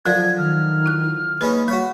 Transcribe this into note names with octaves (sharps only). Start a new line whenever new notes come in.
D3 F3 F#3 A#4 D5 G#6
D#3 F6
E4 F#6
G#3 A#3 C#4 D#4 B4 B5
G3 F#4 C#5 B5